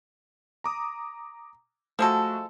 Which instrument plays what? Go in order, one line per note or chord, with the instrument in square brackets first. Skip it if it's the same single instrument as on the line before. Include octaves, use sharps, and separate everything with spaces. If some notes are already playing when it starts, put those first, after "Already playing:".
[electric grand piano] A#5 D6 D#6
[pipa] F3 G#3 A4 [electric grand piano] A3 F#4